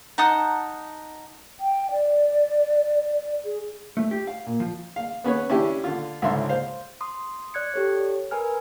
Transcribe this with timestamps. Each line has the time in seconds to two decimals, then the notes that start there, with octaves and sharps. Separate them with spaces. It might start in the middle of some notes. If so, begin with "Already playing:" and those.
0.18 D#4 F#5 A5 D#6
1.60 G5
1.92 D5
3.45 G#4
3.97 A3
4.11 G4
4.27 F5
4.47 A#2
4.60 F3
4.96 F5
5.24 B3 C#4 B4 C#5
5.50 C#4 D4 E4 G4
5.84 D3 F4
6.22 C#2 G#2 D3 E5 C6
6.49 C5 F5
7.01 C6 D#6
7.54 D5 F#6 G#6 C#7
7.74 G4 A4 C#5
8.31 A#4 B4 G#5 F6